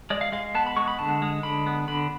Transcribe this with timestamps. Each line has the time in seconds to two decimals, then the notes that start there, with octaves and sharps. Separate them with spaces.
0.10 G#3 D5
0.21 F5
0.32 G#3 F5
0.55 B3 A5
0.67 B5
0.76 G#3 C#6
0.88 B5
0.99 D3 A5
1.22 G#3
1.43 D3 B5
1.66 B3
1.88 D3 B5